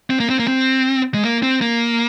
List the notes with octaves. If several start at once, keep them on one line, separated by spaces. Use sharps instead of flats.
C4
A#3
C4
A#3
C4
G#3
A#3
C4
A#3